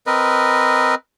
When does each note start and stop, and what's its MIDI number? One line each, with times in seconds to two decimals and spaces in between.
0.07 0.95 60
0.07 0.95 70
0.07 0.95 71
0.07 0.95 75